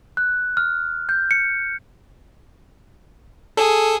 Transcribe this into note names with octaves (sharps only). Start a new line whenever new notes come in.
F#6
F6
G6
C#7
G#4 A4